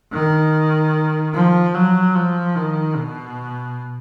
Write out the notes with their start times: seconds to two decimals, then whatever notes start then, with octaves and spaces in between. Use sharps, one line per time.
0.12 D#3
1.34 F3
1.74 F#3
2.15 F3
2.55 D#3
2.95 B2